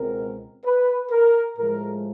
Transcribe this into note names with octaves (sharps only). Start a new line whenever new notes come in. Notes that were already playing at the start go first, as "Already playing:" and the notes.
Already playing: C#2 B2 G#3 C4 A#4
B4
A#4
A2 F3 G#3 A#4